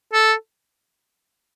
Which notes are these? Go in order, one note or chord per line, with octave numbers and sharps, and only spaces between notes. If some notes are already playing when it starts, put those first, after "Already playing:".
A4